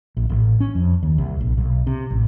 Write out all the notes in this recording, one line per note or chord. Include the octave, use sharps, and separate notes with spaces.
A#1
A1
C#4
F2
D#2
C2
A#1
B1
C3
A1